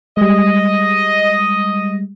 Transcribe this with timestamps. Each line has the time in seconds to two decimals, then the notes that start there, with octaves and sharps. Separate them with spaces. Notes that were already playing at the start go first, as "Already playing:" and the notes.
0.17 G3 G#3 D#5